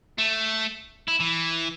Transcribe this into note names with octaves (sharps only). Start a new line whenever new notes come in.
A3
E4
E3